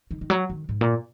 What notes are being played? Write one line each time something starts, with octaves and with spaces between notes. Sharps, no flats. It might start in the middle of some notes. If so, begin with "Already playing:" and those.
D#3
D#3
F#3
D#3
G#2
A#2